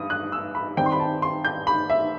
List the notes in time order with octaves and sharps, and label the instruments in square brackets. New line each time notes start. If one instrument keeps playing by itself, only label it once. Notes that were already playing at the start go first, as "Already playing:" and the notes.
Already playing: [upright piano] G2 D#6
F#6
E6
B5
D#3 G3 C4 D#4 G5
C6
B5
A5
C6
G6
B5
E5